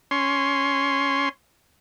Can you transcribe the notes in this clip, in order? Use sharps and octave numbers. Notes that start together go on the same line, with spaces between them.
C#4 C6